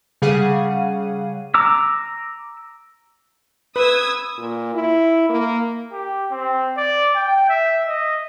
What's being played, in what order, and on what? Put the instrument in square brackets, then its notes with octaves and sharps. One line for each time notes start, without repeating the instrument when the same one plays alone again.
[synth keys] C#3 G3 G#4 F5 F#5 D#7
[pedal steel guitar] A#5 D6 E6
[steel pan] B4 [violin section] D#6 E6 G#6
[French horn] A#2
E4
A#3
[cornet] G4
C4
D5
G5
E5
D#5